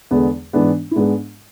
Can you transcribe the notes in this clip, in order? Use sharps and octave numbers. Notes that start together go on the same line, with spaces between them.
E2 D3 G#3 B3
G#2 E3 G#3 B3 D4
E4
G#2 G#3 B3 D4